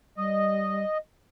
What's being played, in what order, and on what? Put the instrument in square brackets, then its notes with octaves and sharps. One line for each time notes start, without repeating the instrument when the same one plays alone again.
[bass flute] G3 [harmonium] D#5